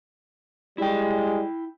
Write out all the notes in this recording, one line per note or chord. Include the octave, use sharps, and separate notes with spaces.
G3 G#3 E4 G5